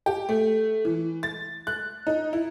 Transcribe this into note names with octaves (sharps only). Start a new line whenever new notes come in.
G4
A3
E3
A6
F#6
D#4
E4